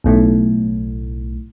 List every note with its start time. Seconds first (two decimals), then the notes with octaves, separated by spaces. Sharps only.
0.04 B1 A2